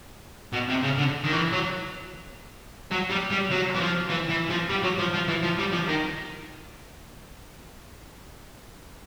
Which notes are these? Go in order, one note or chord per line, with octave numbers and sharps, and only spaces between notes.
B2
C3
C#3
D3
D#3
E3
F#3
F#3
G3
G3
F#3
E3
F3
E3
E3
F3
G3
F#3
F3
F3
E3
F3
G3
F3
D#3